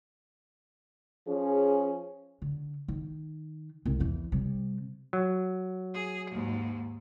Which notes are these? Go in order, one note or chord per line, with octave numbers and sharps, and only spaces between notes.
F3 C#4 G#4
D3
D#3
C2 G#3
E2 E3
C3 G3
F#3
G#4
D#2 G#2